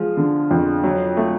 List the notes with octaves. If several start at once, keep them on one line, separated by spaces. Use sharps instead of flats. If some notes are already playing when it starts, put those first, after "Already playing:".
Already playing: F3 G#3
D3
F2
F#3
A3